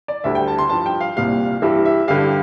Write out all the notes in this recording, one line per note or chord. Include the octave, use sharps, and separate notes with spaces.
D5
D2 D3 G3 E5
G5
A5
C6
G2 F3 A5
G5
F5
C2 A#2 G3 F5
G2 E3 G3 E5
E5
G2 D3 G3 F5